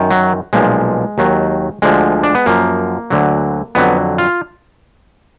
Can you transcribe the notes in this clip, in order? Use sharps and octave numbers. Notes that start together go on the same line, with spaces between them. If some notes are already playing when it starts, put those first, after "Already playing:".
Already playing: F#2 D#3
F#3
B1 A#2 F3 G#3
D#2 D#3 F#3
D2 D3 F3 G#3
D4
B3
F#2 F3 A#3
D2 D3 F#3
F2 D3 F#3 B3
F4